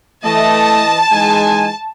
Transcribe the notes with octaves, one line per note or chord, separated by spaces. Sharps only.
E3 A3 D#5 A5
E3 G#3 D#4 G#5